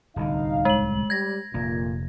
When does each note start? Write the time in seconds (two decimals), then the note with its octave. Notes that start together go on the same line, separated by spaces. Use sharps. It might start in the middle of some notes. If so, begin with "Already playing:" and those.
0.16 D1 C2 D3 D#4 F5
0.65 G#3 F#7
1.10 G3 G#6 A#6
1.54 F1 A#2 A#3